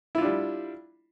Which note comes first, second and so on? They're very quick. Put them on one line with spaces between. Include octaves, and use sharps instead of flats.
E4 F4 D4 G3